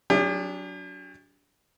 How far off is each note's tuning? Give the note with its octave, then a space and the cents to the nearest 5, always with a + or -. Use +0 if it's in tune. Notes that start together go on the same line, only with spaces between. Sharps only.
F#3 +0 D4 -30 G4 +45